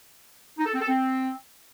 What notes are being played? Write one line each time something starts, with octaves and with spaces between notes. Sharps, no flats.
D#4
A4
C4
A4
C4